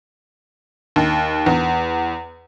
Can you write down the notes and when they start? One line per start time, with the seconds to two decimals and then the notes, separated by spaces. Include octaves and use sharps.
0.96 D#2
1.46 E2